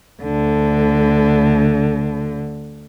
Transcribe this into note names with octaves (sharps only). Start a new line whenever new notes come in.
D2 D3